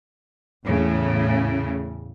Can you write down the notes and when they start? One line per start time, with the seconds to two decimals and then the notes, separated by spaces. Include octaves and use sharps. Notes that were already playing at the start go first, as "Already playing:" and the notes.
0.66 E2 A2 C#3